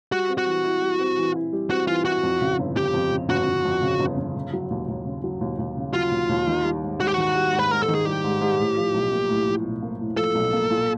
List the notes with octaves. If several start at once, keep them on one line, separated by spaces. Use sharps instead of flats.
G3 F#4
C4
F#4
E3
E4
G3
C4
E3
E4
G3
C4 F#4
E3 F4
E4 F#4
F2
C#3
G1
G1 G4
F2
C#3
G1 F#4
G1
F2
C#3
G1
G1
C#3
F#3
D#2
D#2
C#3
F#3
D#2
D#2
C#3
F#3 F4
D#2
D#2
D#3
G3
G#2
G#2 F#4
G4
D#3 F#4
G3
G#2
B4
G#2 A#4
A4
D#3
G#4
G3 G4
G#2
G#2
A2
F3
B1
A#3
A2
F3
B1
A#3
A2
F3 A4
B1
A#3
A#2